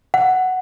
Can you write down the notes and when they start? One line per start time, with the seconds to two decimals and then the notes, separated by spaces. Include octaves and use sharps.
0.14 F#5